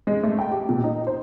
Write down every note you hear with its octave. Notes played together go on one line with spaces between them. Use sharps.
G#3
A3
G5
G4
A#2
D#4
C5